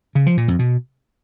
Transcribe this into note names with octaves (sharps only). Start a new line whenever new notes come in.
C#3
F3
A#2
F2
B2